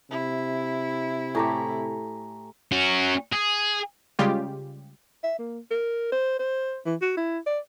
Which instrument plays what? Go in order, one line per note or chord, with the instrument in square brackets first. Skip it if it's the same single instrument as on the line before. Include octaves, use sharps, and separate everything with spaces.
[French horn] C3 [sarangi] E4
[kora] A2 A3 G4 [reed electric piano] G#5 A#5
[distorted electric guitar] C#4 F#4
G#4
[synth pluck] C#3 G3 G#3 F4 G4
[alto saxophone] E5
A#3
A#4
C5
C5
E3
F#4
E4
D5